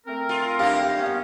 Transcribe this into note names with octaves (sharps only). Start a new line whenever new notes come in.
A3 C4 A#4
F4
F#2 G4 F5
A#3 B3 C#4